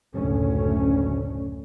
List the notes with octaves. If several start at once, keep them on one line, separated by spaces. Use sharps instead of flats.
F#1 D2 A2 A3 C#4